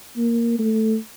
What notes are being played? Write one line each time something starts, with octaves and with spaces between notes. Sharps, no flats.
A#3
A3